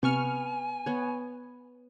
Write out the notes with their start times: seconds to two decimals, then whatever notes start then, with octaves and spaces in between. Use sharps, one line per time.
0.03 C3 B3 G#5 C#6 F6
0.86 B3 C#5